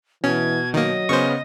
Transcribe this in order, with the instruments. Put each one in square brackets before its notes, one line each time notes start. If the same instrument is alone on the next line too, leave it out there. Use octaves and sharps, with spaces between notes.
[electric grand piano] B2 [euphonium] E3 [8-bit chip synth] C#4 [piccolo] G#6
[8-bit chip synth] D#3 A#3 [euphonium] F#3 [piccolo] D#5
[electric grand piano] C#3 B3 C#4 [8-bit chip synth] C5 C#6